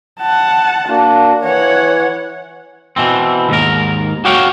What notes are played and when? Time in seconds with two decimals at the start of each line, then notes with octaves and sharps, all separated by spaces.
0.21 F#5 A5
0.88 A#3 D4 F#4
1.44 E3 C#5 F#5
2.96 B2 E3 C4
3.49 D#2 G#2 A#4
4.25 F#4 G4 C#5 F5 G5